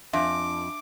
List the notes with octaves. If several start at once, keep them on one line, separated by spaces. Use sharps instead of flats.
F2 D4 E5 D6